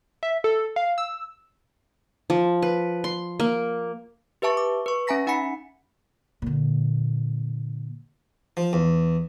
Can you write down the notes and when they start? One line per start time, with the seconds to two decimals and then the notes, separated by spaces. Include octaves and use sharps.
0.23 E5
0.44 A4
0.76 F5
0.98 E6
2.30 F3
2.62 B4
3.04 C6
3.40 A#3
4.42 G4 B4 E5 A5 C#6
4.57 D6
4.86 B4 C#6
5.07 C#4 E5 G#5 A#5 A#6 B6
5.27 D#4 F#5 G#5 B5 C#7
6.42 A#2 D3
8.57 F3
8.73 E2